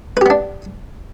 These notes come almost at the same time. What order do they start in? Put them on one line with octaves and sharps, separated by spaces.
B4 G4 B3 D4